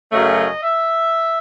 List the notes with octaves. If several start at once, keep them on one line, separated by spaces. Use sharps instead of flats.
F#2 C#3 F#3 A3 C#4 D#5
E5